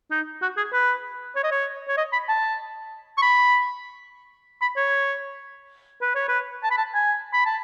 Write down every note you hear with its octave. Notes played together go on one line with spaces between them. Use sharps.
D#4
F#4
G#4
B4
C#5
D#5
C#5
C#5
D#5
B5
A5
C#6
B5
B5
C#5
B4
C#5
B4
A5
B5
A5
G#5
B5
A5